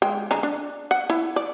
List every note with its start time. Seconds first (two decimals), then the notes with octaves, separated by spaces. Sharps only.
0.02 G#3 G5
0.31 D3 G#3 A#5
0.43 D4
0.91 F#5
1.10 E4
1.36 D5